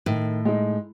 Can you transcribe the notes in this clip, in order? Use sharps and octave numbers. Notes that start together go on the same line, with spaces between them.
A2 D#3
G#3 D#4